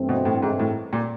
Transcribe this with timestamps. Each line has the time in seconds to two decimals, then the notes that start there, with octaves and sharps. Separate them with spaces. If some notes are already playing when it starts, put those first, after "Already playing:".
Already playing: G2 E3 A3 C4
0.09 B2
0.25 A2
0.42 G#2
0.59 A2
0.93 A#2